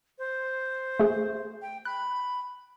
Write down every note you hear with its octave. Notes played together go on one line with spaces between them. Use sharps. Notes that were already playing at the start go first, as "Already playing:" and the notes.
C5
A3 G#4
G5
B5 F#6